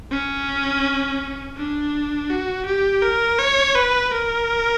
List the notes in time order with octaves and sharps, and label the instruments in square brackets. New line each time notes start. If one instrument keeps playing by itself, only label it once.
[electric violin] C#4
D4
F#4
G4
A#4
C#5
B4
A#4